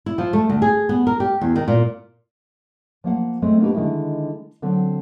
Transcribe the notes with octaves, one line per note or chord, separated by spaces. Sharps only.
E4
F3
A3
D2
G#4
B3
A#4
G4
E2
D#3
A#2
F3 A#3 F#5
G#3 A3 C4
A#3 D4 D#4 F#4 G4 B4
D3 D#3 G#3 D#4 E4
D3 F#3 C4